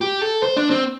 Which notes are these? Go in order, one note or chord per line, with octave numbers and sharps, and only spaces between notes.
G4
A4
C5
D4
C4